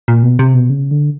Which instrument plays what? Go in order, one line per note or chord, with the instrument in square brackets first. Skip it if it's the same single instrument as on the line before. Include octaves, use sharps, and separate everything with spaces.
[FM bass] A#2
B2
C3
B2
C#3
D3